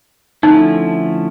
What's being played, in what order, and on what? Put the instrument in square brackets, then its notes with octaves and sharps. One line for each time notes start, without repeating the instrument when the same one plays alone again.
[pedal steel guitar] D3 F3 A3 C#4 E4 [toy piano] D#4